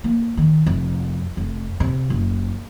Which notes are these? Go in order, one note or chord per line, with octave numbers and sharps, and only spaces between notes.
A#3
D#3
F1
F1
C3
F#1